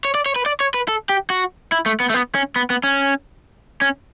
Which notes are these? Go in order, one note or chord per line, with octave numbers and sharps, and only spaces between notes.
C#5
D5
C#5
B4
D5
C#5
B4
A4
G4
F#4
E4
A3
B3
A3
B3
C#4
B3
B3
C#4
C#4